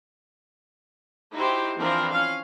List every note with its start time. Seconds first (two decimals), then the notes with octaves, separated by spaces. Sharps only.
1.33 D#4 E4 F#4 G4 C5
1.78 E3 F3 C4 D4 F4 A#4
2.13 C#4 F5